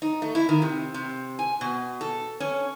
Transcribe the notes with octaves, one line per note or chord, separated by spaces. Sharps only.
D#4
A3
E4
D#3
C3
C3
G#5
B2
A4
C#4